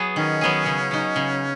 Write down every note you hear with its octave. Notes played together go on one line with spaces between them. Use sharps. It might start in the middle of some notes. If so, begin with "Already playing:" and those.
Already playing: F#3 B3 F#4 G#4
D#3 C#4
F#3 B3 G#4
C#3
F#3 D#4
C#3